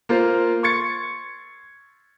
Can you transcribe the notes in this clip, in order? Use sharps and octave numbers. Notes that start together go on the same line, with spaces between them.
A#3 F4 C5
C6 C#6 G#6 A6 C#7